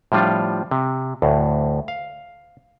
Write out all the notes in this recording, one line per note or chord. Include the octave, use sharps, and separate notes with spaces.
A2 F3 G3 D4 F4
C3
D2 A2
F5